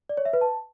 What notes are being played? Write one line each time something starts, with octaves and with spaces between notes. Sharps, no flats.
D5
C#5
E5
B4
A5